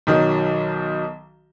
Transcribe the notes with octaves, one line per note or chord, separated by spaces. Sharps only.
B1 D#3 F#3